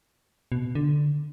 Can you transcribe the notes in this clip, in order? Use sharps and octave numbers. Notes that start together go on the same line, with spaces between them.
B2
D3